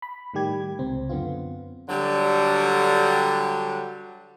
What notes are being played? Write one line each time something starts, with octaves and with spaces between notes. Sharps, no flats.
B5
A2 D#3 G3 G4 G#6
C#2 C3 C4
F#2 D3 B3 C4 F4
D3 F#3 G3